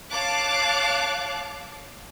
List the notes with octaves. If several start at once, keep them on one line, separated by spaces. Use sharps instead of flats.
C#5 F5 A5 D6 F#6